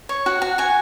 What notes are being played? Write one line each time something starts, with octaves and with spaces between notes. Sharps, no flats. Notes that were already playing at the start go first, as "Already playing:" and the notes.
C#5
F#4
F#4
F#4 G#5